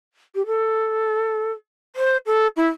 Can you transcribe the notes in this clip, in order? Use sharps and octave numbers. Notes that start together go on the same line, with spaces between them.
G4
A4
C5
A4
E4